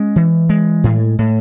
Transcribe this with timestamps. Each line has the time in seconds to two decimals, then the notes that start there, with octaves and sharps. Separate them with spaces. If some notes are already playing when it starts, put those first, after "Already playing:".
Already playing: G#3 C#4
0.16 E3
0.49 G#3
0.84 A2
1.19 A2